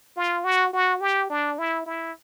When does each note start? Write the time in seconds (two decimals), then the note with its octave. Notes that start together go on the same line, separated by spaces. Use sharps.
0.16 F4
0.44 F#4
0.73 F#4
1.01 G4
1.30 D4
1.59 E4
1.86 E4